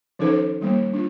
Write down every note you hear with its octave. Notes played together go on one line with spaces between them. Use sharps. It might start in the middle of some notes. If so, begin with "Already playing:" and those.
D#3 F3 C#4 D#4 A4 C5
D#3 G3 A#3
D4 F4